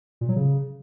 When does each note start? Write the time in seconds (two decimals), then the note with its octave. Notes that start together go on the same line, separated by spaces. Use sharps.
0.21 A#2
0.29 F#3
0.36 C#3